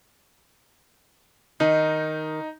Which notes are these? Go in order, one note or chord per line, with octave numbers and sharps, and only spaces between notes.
D#3 D#4